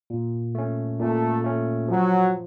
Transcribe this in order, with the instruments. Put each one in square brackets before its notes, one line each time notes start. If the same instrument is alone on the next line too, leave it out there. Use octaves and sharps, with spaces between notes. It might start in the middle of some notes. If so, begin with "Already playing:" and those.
[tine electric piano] A#2
A3 C#4
[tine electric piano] A#2 [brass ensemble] A3
[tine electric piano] A3 C#4
[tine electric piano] F3 [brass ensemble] F#3